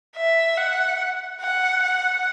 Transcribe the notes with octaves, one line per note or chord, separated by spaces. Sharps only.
E5
F#5
F#5
F#5